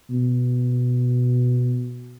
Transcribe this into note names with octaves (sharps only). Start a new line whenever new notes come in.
B2